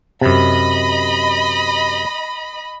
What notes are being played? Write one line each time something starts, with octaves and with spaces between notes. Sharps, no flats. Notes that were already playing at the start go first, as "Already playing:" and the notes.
F#2 C3 D#5 B5